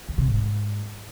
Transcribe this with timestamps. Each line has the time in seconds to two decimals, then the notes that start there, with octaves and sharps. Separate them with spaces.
0.09 E2
0.18 C3
0.28 G#2